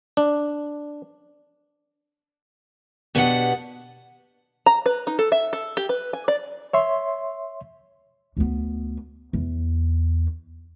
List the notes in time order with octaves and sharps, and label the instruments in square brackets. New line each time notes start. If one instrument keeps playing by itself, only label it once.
[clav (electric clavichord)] D4
[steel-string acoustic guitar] B2 B3 D4 G4 A#4 F#5
[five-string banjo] A#5
B4
D#4
A4
E5
A4
G4
B4
G#5
D5
[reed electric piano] C#5 E5 C6
[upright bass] D2 B3
E2